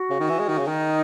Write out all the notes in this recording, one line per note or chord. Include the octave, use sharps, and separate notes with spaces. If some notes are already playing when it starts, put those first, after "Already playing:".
Already playing: F#4
C#3
D#3
E3
G#3
D#3
C#3
D#3 D#4